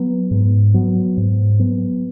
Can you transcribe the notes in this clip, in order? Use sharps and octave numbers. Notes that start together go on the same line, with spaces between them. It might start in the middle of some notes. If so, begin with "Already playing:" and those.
Already playing: F#3 B3
G#2
F#3 B3
G#2
F#3 B3